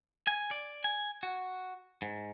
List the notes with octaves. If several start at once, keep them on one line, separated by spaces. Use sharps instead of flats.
G#5
D5
G#5
F#4
G#2